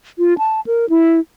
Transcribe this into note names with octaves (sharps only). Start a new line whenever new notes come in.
F4
A5
A#4
E4